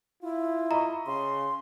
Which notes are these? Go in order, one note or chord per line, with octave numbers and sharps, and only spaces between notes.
E4 F4
D#5 A#5 B5 C#6
C#3 C6